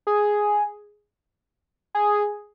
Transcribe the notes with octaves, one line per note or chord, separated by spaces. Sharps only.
G#4
G#4